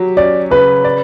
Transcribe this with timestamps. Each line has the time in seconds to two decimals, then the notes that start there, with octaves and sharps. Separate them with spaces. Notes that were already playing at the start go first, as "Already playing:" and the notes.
Already playing: F#3 G4
0.17 C#4 D5
0.51 C#3 B4
0.84 D5